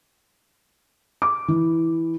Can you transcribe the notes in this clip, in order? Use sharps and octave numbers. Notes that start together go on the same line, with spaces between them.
D6
E3